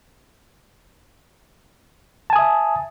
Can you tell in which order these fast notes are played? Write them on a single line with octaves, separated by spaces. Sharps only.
A5 G#5 D#6 E5